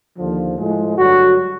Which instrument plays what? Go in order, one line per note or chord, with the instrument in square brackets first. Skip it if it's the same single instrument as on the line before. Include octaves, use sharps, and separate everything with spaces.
[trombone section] D#2 D3 F3
A2 F3 G#3
G2 D3 F#3 F#4